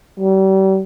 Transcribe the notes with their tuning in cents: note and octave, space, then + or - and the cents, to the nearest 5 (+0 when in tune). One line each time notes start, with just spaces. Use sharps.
G3 -35